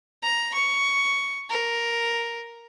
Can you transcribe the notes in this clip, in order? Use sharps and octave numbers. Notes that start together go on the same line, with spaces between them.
A#5
C#6
A#4